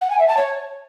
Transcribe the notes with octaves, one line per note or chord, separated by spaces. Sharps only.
F#5
G#5
E5
A5
C#5